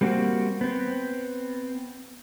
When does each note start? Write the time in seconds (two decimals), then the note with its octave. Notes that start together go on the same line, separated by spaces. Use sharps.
0.01 G3 A#3 C4 F#4
0.61 B3 C4